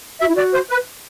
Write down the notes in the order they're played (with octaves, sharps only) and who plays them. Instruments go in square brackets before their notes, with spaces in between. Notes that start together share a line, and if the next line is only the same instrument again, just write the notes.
[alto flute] F#4 [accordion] E5
[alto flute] E4
[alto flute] F#4 [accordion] D5
[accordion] C5
B4